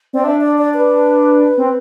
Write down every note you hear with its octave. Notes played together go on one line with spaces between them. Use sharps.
C4 D5
D4 E5
D5
D5
B4
C4